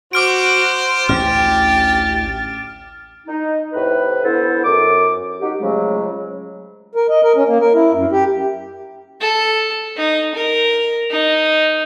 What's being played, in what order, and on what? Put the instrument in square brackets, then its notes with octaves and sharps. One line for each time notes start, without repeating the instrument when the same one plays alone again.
[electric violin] F#4 [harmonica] C5 [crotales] D6 F6 D7
[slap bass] A1 D2 C#4 [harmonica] G4 [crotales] F6 [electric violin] A6
[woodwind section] D#4
A2 C3 B4
D3 B3 E4 A4 C5
F#2 D6
D#4 F#4 G4
C#3 F3 F#3 G#3 A3
[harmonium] A#4
D#5
A#4
C#4
A#3
A#4
E4
F#2
G4
[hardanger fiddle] A4
D#4
A#4
D#4